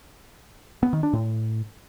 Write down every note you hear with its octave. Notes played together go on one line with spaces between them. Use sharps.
B3
D#3
D4
A2